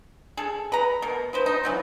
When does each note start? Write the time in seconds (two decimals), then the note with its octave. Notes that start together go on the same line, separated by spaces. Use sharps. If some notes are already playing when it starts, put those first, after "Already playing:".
0.37 G#4 A4
0.72 B4 A#5
1.02 B2 A#4
1.33 F3 B4 C5
1.46 D#4
1.63 E3 F#3 F4